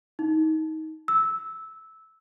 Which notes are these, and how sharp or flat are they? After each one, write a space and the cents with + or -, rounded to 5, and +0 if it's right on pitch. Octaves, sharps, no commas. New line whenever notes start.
D#4 +25
E6 -10